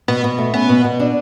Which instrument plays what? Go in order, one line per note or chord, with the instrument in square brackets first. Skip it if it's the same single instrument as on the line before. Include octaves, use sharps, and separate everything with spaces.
[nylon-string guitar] B2 [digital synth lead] B3
[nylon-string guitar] B2
A3
[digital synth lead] B3 [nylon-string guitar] C#4
[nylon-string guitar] B2
B2
D4